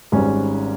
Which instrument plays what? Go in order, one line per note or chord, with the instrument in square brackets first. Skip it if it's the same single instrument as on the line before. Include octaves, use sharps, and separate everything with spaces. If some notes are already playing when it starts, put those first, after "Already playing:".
[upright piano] G#1 G#2 G3 C#4